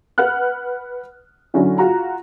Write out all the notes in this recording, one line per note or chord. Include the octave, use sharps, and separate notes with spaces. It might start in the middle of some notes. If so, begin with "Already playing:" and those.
B4 F#5 F6 F#6
D3 F#3 C#4 E4
F4 F#4 A#5